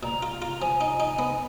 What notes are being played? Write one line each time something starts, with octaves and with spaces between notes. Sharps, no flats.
A#2 A#5
F4
F4
F3 G#5
D#4
D#4
B3